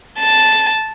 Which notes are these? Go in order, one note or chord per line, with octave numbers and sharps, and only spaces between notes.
A5